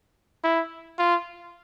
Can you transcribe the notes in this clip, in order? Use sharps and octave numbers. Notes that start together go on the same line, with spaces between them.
E4
F4